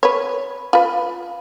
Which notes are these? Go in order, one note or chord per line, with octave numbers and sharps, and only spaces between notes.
B4 C#5
F4 B4